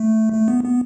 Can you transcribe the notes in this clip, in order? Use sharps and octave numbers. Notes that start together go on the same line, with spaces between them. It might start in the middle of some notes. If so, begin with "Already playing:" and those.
Already playing: A3
A3
B3
B3